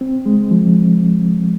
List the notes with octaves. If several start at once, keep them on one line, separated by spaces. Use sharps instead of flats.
C4
G#3
F3